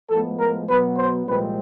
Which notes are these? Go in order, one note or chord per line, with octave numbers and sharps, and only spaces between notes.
A2 F3 G#3 B3 A4
A#4
B2 F#3 B3 B4
C5
C2 A#2 F3 G#3 C4 B4